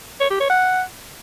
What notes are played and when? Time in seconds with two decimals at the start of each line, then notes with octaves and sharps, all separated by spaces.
0.21 C#5
0.31 G4
0.40 C#5
0.50 F#5